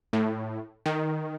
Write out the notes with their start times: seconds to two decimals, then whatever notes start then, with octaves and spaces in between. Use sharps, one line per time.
0.13 A2
0.86 D#3